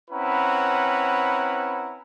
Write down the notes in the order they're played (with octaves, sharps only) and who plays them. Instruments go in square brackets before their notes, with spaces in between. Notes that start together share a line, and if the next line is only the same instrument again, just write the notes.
[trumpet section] C4 C#4 E4 B4 F#5 A#5